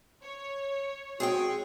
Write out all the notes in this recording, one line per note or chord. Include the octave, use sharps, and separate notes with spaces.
C#5
G#3 C4 F#4 G#4 C#5 G5